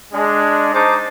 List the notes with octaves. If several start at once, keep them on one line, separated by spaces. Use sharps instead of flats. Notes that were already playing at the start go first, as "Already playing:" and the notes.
G#3 D4
D#4 C5 A5 D6